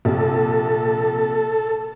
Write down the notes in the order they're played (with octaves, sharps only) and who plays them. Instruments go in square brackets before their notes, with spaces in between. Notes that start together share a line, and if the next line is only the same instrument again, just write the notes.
[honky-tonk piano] A#1 C3 [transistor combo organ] A4